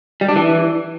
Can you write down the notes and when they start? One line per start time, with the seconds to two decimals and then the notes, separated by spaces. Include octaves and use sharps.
0.21 G3
0.29 D4
0.36 E3